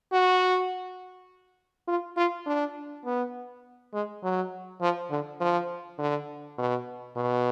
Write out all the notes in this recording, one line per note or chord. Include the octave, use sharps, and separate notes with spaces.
F#4
F4
F4
D4
B3
G#3
F#3
F3
D3
F3
D3
B2
B2